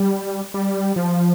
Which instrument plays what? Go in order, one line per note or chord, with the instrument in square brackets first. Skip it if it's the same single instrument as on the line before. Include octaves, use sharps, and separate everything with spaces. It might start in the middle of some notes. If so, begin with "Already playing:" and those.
Already playing: [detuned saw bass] G3
G3
F3